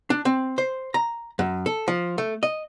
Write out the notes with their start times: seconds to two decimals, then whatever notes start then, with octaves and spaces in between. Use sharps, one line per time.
0.10 D4
0.25 C4
0.58 C5
0.94 A#5
1.39 F#2
1.66 A4
1.88 F3
2.18 A3
2.43 D#5